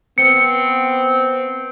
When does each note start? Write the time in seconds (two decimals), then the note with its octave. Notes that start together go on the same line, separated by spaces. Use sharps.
0.18 B3 C4 C#7